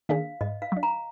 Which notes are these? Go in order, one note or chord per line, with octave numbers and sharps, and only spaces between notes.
D#3 A#3 D4 G#4 F5
G#2 D#5
F5
F#3 D4
A#5